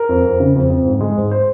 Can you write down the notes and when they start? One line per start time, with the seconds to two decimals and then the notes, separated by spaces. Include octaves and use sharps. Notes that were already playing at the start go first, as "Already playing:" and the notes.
Already playing: A#4
0.09 F2
0.25 F2
0.40 C#3
0.55 F2
0.70 F2
0.85 G#2
1.01 G#3
1.17 G#2
1.31 C5